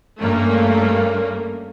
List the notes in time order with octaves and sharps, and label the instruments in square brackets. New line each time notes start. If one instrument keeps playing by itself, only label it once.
[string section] G2 A3 A#3 C#4